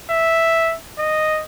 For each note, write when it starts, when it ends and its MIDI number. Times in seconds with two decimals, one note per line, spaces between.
0.10 0.75 76
0.99 1.42 75